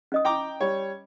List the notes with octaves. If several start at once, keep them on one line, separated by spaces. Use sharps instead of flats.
C#4 D#5 D#6
G5 A#5 D6
G3 C#5